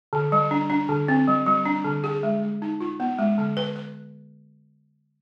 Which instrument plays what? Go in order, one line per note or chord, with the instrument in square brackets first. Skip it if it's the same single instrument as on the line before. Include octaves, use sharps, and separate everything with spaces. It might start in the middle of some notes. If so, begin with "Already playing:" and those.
[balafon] D3
G3
D4
D4
D3
C4
G3
G3
D4
D3
G#4
G#3
G#3
D#4
F4
B3
G#3
D3
B4
B4